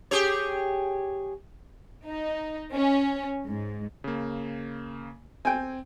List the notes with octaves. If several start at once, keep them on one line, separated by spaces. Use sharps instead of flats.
G4 G#4 C#5
D#4
C#4
G#2
C#3 A#3
C4 G5 G#5